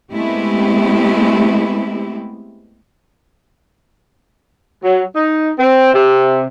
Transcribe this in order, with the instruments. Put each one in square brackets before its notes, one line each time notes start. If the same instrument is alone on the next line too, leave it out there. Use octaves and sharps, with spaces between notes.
[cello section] G#3 A3 B3 C4 E4 G4
[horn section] F#3
D#4
C4
C3